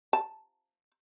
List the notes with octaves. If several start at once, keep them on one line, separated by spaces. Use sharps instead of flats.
A5